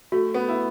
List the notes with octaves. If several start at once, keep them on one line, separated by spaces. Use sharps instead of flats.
A3 F#4
B3
E4